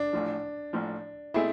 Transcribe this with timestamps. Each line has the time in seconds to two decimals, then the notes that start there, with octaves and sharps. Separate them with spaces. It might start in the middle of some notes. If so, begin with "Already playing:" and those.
Already playing: D4
0.13 A1 A2 F3
0.73 A1 A2 F3
1.34 B2 A3 C4 E4 G#4